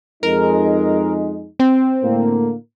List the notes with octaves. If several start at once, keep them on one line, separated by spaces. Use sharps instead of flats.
F2 G#3 D#4 A#4
C4
A2 D3 A#3